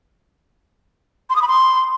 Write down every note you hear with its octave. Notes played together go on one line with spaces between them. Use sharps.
C6
D#6
B5
C6